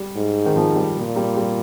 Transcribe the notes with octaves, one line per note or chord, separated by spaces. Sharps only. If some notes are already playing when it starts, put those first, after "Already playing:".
Already playing: G3
G#2
D#3
F3
G3
A#2
G3
G3